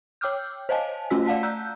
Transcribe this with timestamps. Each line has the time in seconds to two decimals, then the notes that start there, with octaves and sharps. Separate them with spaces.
0.21 C#5 G5 D6 E6 F6 G6
0.69 C5 C#5 D#5 F5 G#5 A5
1.10 A3 C#4 F4 F#4 E6 B6
1.26 D5 F5 F#5 A5 B6
1.43 A#5 E6 F#6 G6